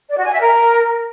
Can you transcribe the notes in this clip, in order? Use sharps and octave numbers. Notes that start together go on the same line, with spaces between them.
D5
F#4
G#5
E5
A#4